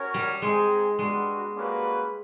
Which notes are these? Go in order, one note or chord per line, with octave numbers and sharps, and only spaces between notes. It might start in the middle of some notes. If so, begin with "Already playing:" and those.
Already playing: C#4 F#4 A#4 C#5
G3
G#3 C4 D#4 G#4
G3 G#3 B3 D4 F#4
G3 A#3 C#4 F#4 B4